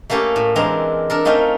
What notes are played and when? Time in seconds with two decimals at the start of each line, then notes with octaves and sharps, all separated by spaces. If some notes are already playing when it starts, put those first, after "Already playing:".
0.10 A3 A#3 C#4 G4 A4
0.36 A2
0.56 E3 G#3 C4 D4 A#4 A#5
1.10 D4 A4 A#4
1.25 A3 C4 C#4 D#4 F4